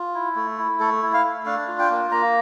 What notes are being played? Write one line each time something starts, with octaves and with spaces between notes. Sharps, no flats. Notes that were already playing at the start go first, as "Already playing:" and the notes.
Already playing: F4
E4
A3
E4
A3 A4
E4
F5
A3
D4 F5
F4
G5
A#3
A#3 A#5